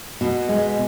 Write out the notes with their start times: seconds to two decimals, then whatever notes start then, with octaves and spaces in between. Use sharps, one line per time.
0.21 B2
0.49 G#3